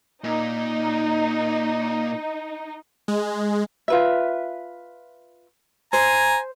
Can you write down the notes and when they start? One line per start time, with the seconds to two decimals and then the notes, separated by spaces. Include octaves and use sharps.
0.24 A#2 D#4
3.08 G#3
3.88 F4 B4 E5
5.93 C5 G#5 A#5